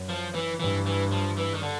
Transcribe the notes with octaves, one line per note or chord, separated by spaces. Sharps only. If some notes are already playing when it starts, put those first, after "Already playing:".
Already playing: F#2
F3
E3
G2 E3
E3
F3
E3
D#3
D3